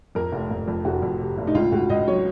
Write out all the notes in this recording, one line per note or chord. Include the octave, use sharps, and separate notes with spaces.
F2 A#4
F1
F1
F2
F1 F#4
F2
C3
F1
D#4
C#2 F4
C#2 F#4
C#2 D#5
F#3 C#5